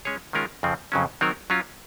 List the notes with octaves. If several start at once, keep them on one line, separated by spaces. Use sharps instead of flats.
G#3 C#4 G#4 C#5
D#3 G#3 C#4 F4 A#4
F2 C#3 F3 C4
F2 C#3 F#3 C#4
D#3 F#3 C4 D#4 A#4
F#3 C#4 F4